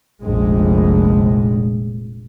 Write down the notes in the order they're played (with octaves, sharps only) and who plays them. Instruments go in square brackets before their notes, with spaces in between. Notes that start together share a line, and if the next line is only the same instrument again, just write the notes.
[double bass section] F1 A#1 G#3